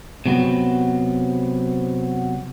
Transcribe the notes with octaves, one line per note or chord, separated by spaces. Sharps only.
C3 F#3 B3